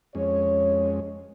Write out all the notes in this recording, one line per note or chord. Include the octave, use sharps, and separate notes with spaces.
F2 G#3 C#4 C#5